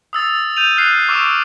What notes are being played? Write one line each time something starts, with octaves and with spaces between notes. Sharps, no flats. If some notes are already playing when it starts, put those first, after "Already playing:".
D#6 E6 A6
G6 D#7 F7
F6 F#6 C7 D#7 F7
C#6 D6 E6 D7 E7